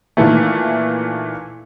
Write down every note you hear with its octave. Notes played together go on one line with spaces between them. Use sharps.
A#2 D#3 E3 A3